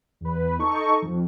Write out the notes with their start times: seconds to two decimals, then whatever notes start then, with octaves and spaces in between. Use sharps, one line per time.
0.21 E2 B4
0.59 D#4 A4 C#6
1.02 F2